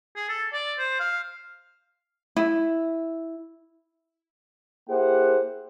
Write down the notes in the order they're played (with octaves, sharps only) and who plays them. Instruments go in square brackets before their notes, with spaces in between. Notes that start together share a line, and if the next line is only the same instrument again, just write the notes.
[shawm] G#4
A4
D5
C5
F5
[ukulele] E4
[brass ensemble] A#3 E4 G4 G#4 C5 F#5